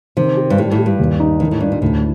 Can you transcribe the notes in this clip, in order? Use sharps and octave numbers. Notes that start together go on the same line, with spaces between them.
C3 D#3
G4
G2
A2 G3
A2
G4
G2
D#2
D#4
A2 D#3
A2
G2 D4
A#2
D2 A2